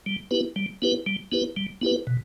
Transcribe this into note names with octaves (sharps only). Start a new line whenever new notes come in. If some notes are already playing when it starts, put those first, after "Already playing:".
G3
B3 E4 G4 B4
G3
B3 E4 G4 B4
G3
B3 E4 G4 B4
G3
B3 E4 G4 B4
B2